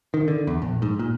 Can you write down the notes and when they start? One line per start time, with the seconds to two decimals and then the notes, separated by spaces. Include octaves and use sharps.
0.14 D#3
0.28 D3
0.47 E2
0.62 A#1
0.82 G#2
0.99 A#2